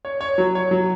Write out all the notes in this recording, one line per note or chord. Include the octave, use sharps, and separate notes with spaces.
C#5
C#5
F#3
C#5
F#3